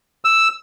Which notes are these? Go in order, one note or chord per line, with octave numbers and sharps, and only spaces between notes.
E6